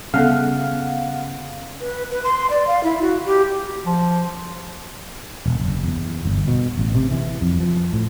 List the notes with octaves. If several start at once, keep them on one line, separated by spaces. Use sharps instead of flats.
C#3 G3 B3 A4 F5 F#5
B4
B4
C6
D5
F5
E4
F#4
G4
F3
E1
F#1
E2
G1
B2
A1
C3
E3
F2
F3
A2